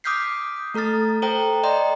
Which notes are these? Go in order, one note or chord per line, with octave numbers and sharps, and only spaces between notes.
D6 D#6 F6 G6 B6 C7
A3 A4 A#5 F6 A6
A4 C5 G5 A#5
D5 D#5 G5 A#5 C6